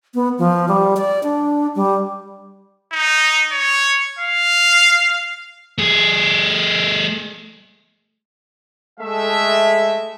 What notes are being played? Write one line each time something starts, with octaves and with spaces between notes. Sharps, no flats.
B3
F3
G3
D5
D4
G3
D#4
C#5
F5
A3 G#4
G#3 A3 E5